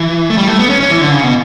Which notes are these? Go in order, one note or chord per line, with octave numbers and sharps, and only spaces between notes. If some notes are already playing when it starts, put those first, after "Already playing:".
Already playing: E3
A3
G3
A3
B3
C#4
C#4
E3
D3
C#3
B2